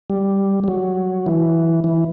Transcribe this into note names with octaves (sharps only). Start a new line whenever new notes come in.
G3
G3
F#3
E3
E3